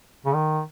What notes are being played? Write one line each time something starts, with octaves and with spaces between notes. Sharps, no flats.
C#3
D#3